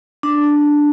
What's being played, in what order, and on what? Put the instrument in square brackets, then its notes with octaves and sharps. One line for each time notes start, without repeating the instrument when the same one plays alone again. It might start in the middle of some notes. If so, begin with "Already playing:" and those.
[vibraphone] D4